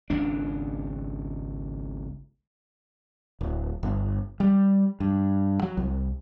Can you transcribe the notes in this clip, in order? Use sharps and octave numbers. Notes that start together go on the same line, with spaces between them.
G#1 C#2 D4
D1
G1
G3
G2
F#3
C2